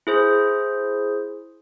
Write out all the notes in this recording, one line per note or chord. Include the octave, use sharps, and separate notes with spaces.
E4 G#4 C5